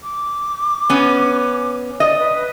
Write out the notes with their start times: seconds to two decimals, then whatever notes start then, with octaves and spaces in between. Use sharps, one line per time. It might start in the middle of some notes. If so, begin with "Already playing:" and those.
0.03 D6
0.90 B3 C#4
2.00 D5 D#5
2.19 B4